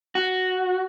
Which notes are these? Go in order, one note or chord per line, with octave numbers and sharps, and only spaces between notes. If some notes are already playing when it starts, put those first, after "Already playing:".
F#4